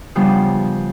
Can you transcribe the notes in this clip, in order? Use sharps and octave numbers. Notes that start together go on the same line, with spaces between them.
C#3 F3 G3 B3 D4